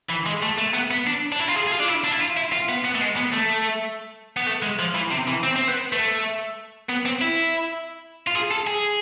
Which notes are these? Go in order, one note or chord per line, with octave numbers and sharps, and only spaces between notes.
E3
G#3
A3
A3
B3
B3
D4
D4
E4
F4
G#4
G#4
F4
D4
E4
D4
E4
F4
E4
F4
B3
B3
A3
G#3
B3
A3
B3
A3
G#3
F3
E3
C3
E3
C4
C4
B3
A3
B3
C4
E4
F4
G#4
A4
G#4